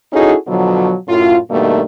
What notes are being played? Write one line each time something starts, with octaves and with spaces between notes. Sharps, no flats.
C#4 D#4 E4 F#4 G#4 A4
B2 D3 F3 F#3
F#2 A2 F4
G2 B2 D#3 A3 A#3